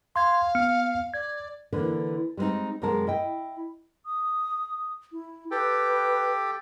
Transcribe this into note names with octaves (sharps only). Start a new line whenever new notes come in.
F5 C6 G#6
B3 F6 C#7
D5 G#6
D3 E3 A#3 D4
G3 G#3 A#3 C4 D#4
F#2 C3 D#3 G#3 A#4 A5
E4 D#5 G5
D#6
E4
G4 A4 B4 G5